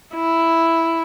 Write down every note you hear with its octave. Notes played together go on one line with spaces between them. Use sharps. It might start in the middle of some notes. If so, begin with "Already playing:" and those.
E4